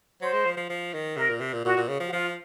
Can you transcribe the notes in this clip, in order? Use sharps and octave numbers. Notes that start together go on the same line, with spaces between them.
F#3 C5
G#3
F3
F3
F3
D#3
C3 A#4
A#2
C3
A#2
A#2 F#4
A#2
C#3
F3
F#4
F3 F4